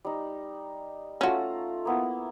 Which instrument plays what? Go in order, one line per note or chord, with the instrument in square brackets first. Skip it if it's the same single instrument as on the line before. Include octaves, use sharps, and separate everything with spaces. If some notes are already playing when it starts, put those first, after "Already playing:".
[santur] G3 D#4
[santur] A3 F4 A#5 [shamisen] C#4 F#4
[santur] A#3 B3 E4